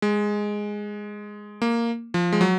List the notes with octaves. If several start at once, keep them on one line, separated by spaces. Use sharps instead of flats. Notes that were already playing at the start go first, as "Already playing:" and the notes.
G#3
A#3
F3
G#3
F#3